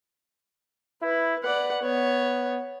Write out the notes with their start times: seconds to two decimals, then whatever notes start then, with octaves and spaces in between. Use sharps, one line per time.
1.02 E4 B4
1.43 B4 D5 F#5
1.82 B3 C#5